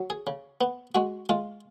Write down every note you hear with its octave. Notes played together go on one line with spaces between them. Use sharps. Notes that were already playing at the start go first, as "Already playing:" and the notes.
Already playing: F#3
G#4
C#3
B3
G#3 F#4
G#3 F4